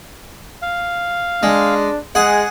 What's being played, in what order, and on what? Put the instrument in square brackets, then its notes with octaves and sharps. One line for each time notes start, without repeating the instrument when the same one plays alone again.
[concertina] F5
[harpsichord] G#3 [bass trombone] D4
[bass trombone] G#3 [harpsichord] G#4 F#5